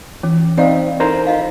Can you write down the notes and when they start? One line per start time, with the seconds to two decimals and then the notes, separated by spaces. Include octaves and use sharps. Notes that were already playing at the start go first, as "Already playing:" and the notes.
0.23 E3 C#4
0.58 C4 D#4 C5 D5 F5 G5
1.00 D#4 E4 A4 A#4 C5 A#5
1.27 F4 D#5 F5